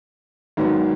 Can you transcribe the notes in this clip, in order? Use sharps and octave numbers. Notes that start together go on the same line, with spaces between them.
G#1 G#2 D#3 F#3 B3